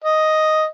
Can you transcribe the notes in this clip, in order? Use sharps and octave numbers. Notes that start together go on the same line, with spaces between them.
D#5